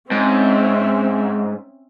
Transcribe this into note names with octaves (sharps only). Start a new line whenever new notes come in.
G#2 C4 C#4 E5